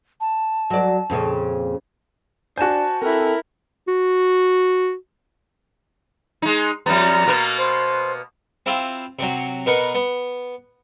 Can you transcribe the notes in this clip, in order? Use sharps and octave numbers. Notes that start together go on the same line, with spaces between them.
A5
F#3 D5
F2 A#2 C#3
D4 F#4 C5 G#5 A5
C4 E4 A4 A#4
F#4
G#3 D#4
F2 G3 B3 A#5
B2 A#3 B3
C5
C4 E4 F4 G4
C3 F#3
B2 A#4 B4 F#5
B3